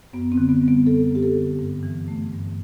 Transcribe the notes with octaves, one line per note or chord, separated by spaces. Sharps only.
F#2 B3
C4
D3
B3
G3
B3
F#2 A4
F#2
G4
A4
D3
G2
E3
A3
G2